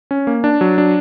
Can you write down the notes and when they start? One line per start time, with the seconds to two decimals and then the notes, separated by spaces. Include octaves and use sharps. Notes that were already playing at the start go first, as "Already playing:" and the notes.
0.11 C#4
0.27 A#3
0.44 D4
0.61 F#3
0.78 D4